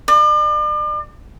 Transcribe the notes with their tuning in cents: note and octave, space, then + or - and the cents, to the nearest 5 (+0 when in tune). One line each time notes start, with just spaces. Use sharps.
D5 +40